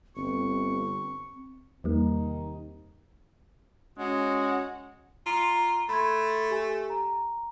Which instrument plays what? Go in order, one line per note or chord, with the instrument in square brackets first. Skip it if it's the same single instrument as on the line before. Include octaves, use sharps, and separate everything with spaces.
[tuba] G1 [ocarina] C4 [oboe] C#6
[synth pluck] E2 G3 A#3 [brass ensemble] C3 D#3 D#4
[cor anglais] G#3 [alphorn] C#4 [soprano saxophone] F#4
[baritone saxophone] F4 [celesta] A#5 C6
[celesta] A#5
[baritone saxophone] A3 [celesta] B5 C6 G#6
[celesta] G4 G#5
A#5